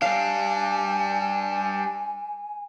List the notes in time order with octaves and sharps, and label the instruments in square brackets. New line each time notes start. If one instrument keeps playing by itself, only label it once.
[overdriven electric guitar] G3 D4 [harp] F5 [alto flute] G#5